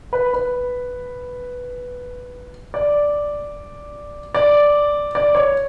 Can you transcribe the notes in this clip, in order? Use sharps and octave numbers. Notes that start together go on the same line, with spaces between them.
B4
B4
D5
D5
D5
C#5